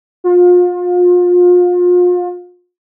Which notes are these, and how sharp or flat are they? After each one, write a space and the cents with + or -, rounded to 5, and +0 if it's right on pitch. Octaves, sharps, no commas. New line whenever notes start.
F4 +35